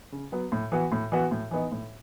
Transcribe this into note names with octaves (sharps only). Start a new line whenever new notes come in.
C#3
F#3 B3
A2
E3 B3 F#4
A2
E3 B3 F#4
A2
E3 B3 D#4
A2